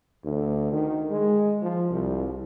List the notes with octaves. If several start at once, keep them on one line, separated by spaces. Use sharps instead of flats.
D2
D#3
G#3
F3
C2